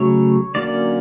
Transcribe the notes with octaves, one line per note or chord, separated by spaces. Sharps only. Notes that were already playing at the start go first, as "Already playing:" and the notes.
Already playing: C#3 F#3 A3 C#5
D3 F#3 A#3 C#4 D5